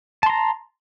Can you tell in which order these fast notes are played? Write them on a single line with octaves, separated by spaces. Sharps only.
A5 C6 A#5